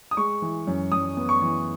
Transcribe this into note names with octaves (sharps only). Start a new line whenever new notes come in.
D#6
G#3 C#6
E3
F#2
F#2 D#6
B3
C#6
E3